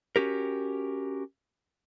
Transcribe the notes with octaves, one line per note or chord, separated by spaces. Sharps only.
C#4 F#4 G4 A#4